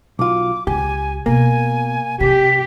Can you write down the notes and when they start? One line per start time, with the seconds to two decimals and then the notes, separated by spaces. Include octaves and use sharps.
0.19 B1 F4 D6
0.67 C#2 G4 G#5
1.26 B2 A#3 G#5
2.20 C3 G4 B6